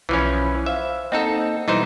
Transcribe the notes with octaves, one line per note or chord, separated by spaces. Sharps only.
B1 E3 F3 C#4 B5 F#6
C5 E5 F5
A#3 C4 D#4 A4 D#5 F#5
B2 E3 G3 D#4 C5